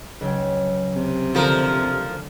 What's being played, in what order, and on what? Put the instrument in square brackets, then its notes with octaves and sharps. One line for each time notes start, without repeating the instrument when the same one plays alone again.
[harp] C#2 F#3 G5
[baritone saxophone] C3
[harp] D2 D3 [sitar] F3 A#4